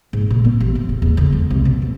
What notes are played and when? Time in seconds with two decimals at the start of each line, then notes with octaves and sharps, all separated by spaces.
0.13 G#2
0.30 A#2
0.44 B3
0.60 A1
0.75 A1
0.89 E1
1.02 E2
1.17 D3
1.32 G#3
1.50 C2
1.65 B2
1.82 D2